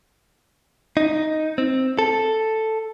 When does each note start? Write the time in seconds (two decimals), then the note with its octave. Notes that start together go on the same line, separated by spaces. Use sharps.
0.97 D#4
1.58 C4
1.99 A4